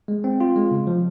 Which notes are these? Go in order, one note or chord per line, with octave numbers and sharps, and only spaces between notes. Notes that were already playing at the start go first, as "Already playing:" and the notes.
G#3
C4
F4
G#3
C#3
F3